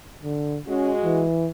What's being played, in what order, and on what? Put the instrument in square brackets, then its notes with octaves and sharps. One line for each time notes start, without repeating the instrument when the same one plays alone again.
[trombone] D3
[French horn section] G#3 F#4 [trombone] C#4
[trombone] E3